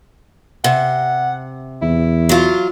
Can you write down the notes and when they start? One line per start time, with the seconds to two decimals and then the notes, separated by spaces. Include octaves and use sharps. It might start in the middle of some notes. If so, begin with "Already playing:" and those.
0.64 C3 F#5
1.82 E2 E4
2.29 F#3 F4